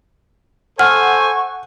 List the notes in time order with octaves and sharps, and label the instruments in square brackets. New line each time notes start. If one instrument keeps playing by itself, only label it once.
[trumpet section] A4 C5 G#5 [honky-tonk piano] F#5 [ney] C#6 [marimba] F6